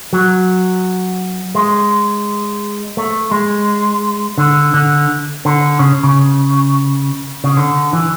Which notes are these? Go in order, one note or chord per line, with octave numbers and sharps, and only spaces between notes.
F#3
G#3
A3
G#3
D3
D3
D3
C#3
C#3
C#3
D3
E3